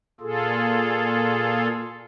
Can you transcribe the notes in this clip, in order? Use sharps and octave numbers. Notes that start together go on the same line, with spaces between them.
A#2 F4 G#4 A4